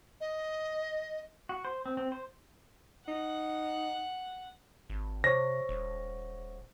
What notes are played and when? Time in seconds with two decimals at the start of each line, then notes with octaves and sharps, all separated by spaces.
0.21 D#5
1.49 F#4
1.65 C5
1.86 C4
1.97 C4
2.12 C5
3.08 D#4 F#5
4.90 G#1
5.24 C3 C5 C#5 C#6 A#6
5.69 D#1